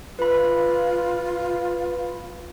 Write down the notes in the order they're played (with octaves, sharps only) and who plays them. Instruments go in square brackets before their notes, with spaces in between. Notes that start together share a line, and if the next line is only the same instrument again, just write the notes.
[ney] F4 [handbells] B4 B5